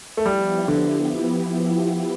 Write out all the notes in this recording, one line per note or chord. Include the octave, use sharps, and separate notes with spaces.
A3
F3 G3 B3 E4 G4
D3